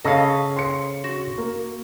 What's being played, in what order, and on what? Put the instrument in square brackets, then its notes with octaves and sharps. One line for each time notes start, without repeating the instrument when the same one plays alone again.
[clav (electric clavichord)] C#3 A4 [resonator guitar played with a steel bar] D#5 F5
[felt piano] C6 C#7
[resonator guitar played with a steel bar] F#4
[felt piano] A#3